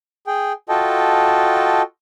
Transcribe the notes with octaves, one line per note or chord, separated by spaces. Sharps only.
G#4 G5
F4 F#4 A4 D#5 G5 A5